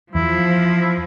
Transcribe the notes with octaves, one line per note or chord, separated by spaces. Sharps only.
E2 F3 E4